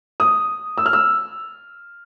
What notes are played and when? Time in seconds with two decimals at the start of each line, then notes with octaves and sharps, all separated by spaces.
0.20 D#6
0.78 E6
0.86 F6
0.93 E6